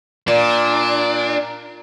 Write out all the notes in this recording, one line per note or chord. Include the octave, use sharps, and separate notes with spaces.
A#2 D4